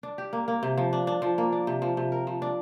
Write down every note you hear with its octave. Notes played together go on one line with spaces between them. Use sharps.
D4
G4
A#3
A#3
C3
F3
D4
D4
F3
A#3
D4
C3
F3
C3
A#4
F3
D4